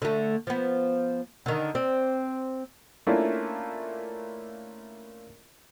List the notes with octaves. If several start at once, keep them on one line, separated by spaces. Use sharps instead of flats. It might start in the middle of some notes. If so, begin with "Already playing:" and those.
D3 A3
F3 B3
D3 D#3
C4 D5
A3 A#3 C#4 D4 E4 F4